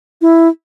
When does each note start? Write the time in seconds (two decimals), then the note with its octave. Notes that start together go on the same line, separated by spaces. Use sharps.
0.22 E4